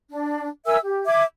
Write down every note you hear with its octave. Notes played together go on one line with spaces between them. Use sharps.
D4
A#4 E5 G#5 E6
G4
E5 D6 G#6